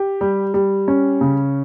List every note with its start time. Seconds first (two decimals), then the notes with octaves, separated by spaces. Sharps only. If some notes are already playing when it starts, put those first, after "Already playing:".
Already playing: G4
0.21 G3
0.54 G3
0.88 C#4
1.21 C#3